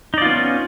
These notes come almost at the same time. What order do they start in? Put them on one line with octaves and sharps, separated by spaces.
D#4 D5 F4 B3 C#4